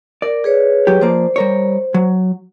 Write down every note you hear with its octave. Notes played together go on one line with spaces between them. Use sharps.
A#4 D5
G#4 B4 C#5
F#3 G4
F3 A#3 C5 D5
G3 A#4 C#5
F#3